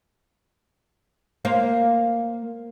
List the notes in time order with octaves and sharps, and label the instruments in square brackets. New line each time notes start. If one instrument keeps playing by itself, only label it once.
[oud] A#3 C5 F5